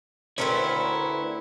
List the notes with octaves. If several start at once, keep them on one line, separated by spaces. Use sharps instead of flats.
D2 A3 C4 C#4 E4 A#4 B4 C#5